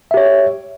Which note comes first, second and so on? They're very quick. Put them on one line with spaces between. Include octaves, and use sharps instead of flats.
E5 G4 C#5